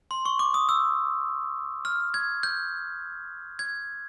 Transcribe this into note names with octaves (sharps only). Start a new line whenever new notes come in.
C6
C#6
D6
D#6
E6
F6
G#6
G6
G#6